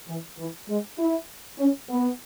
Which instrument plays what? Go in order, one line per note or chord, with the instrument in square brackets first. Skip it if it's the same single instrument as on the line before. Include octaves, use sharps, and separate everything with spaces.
[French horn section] E3
E3
G#3
E4
C#4
B3